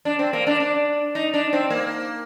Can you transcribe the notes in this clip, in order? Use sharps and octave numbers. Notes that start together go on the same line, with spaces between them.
D4
C4
A#3
D4
D4
D#4
D4
C4
A#3